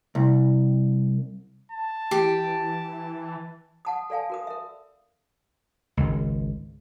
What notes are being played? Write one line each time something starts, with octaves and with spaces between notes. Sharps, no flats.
C2
A5
E3 G4
F#5 A5 D#6
A4 D5 F5 G#5 A5
F#4 A#4 D#6
A#4 E5
G#1 C#2